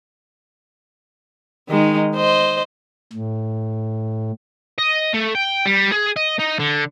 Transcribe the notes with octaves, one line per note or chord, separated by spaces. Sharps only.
D#3 G#3 D#4
C5 D#5
A2
D#5
A3
G5
G3
G#4
D#5
D#4
D3